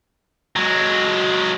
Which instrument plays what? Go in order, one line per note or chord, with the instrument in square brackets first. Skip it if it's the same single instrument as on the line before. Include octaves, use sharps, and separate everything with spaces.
[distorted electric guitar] F#3 G#3